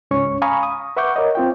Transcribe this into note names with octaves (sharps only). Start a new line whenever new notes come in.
C#2 G#2 C#4 C#5 C#6
F5 G#5 A#5 B5 C#6 D#6
D#6
B4 E5 F#5 C#6 D6 G6
A#4 C#5 D#5
C4 F4 G5